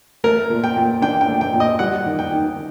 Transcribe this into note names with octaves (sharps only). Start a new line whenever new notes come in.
A3 A#4
A#2
G5
A#2
D4 G5
G5
A3
G5
A#2
D#5
G3 F#5
D#3
G5
D#3